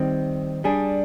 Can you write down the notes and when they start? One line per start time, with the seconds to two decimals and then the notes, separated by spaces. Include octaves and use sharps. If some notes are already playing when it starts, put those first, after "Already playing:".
Already playing: D#3 G3 C4
0.64 G3 D4 G#4